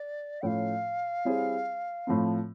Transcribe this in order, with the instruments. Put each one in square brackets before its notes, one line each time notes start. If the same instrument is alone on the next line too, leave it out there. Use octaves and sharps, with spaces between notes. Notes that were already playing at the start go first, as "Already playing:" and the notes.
Already playing: [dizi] D5
[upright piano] A2 F3 A3 C#4 F4 [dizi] F5 G5
[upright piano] G3 C4 E4 G#4 C#5
A2 F3 A3 C4